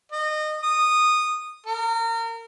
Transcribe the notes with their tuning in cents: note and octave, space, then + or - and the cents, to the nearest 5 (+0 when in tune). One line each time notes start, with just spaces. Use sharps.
D#5 -25
D#6 -15
A#4 -30